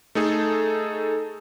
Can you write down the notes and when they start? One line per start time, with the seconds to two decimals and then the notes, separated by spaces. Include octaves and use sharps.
0.15 A3 D#4 G#4 A4